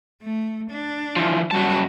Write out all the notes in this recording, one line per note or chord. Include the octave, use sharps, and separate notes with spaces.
A3
D4
E3 F3
F#2 G3 F#4 A5